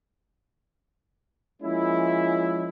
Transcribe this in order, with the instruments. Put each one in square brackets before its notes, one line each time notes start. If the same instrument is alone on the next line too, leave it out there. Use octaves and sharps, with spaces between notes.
[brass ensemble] F3 G#3 A#3 C#4 E4